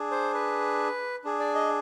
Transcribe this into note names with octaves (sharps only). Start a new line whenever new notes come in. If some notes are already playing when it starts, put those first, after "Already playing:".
Already playing: D4 G#4
C5
B4
D4 G#4
D5
D#5